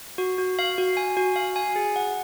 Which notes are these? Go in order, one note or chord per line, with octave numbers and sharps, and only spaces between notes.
F#4
F#4
F5
F#4
G#5
F#4
F5
G#5
G#4
F#5